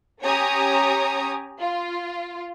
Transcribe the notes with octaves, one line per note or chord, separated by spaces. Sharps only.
C#4 G4 C#5 G#5 A#5 D#6
F4